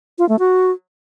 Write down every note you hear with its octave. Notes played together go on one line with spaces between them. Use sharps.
F4
A3
F#4